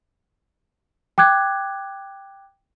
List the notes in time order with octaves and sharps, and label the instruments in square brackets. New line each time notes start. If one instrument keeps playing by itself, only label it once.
[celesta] G5 D6 F#6 G#6